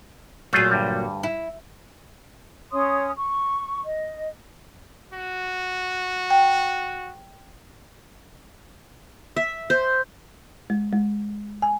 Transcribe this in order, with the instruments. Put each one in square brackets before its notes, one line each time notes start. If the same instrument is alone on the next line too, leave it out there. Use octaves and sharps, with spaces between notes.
[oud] A#2 F#3 [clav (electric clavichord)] A3 F4 G#4
[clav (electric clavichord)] D2 G2 G3
[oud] E4
[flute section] C#4 C#5 C6 D#6
C#6
D#5
[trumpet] F#4
[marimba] G5
[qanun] E5
C5
[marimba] G#3
G#3
G#5